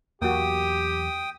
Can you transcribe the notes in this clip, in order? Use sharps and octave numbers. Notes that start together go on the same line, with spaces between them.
E2 E3 F#3 A#3 F#4 G4 G5 D#6